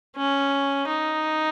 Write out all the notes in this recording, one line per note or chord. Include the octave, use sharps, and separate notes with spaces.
C#4
D#4